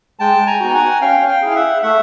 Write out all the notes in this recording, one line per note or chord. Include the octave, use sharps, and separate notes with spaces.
G#3 G5 A5
G#5 A#5
B3 D#4 F#4
G5
F#5 G#5
C#4 F5 G5
F5 G5
E4 G#4
F5
E5 F#5
A3 E5 F#5